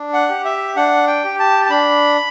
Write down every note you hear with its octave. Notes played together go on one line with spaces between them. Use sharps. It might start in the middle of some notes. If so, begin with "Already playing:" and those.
Already playing: D4
F#5
G4
E5
D4 F#5
G5
G4
A5
A5
D4 B5